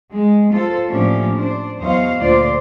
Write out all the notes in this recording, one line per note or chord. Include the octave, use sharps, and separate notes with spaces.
G#3
F4 A4 C5
A2 F3 A#3 C#4 D4 G4
D4 C5
E2 F#3 C5 C#5 D#5 F5
D2 A#2 D3 F4 C5 D5